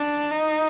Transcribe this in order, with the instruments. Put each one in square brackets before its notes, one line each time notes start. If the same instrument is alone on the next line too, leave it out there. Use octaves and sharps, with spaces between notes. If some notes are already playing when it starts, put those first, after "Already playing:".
Already playing: [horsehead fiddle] D4
D#4